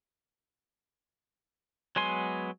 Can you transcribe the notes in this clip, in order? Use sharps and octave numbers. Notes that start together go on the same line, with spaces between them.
F#3 G#3 B3 G#5 C6